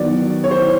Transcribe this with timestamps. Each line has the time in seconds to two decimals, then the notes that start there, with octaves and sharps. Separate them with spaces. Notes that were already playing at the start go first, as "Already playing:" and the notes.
Already playing: D#3 F#3 B3 D5
0.44 C#5
0.51 C5